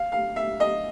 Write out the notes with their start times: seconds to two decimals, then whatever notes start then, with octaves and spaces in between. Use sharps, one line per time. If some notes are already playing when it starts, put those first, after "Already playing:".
Already playing: F5
0.12 F5
0.36 E5
0.60 D#5